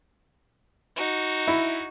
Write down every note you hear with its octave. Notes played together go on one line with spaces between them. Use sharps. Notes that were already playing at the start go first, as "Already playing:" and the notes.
D#4 F#4
E4